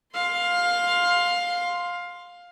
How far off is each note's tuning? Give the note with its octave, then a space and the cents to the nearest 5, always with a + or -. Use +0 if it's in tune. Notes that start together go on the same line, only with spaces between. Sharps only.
F5 +15 C6 +0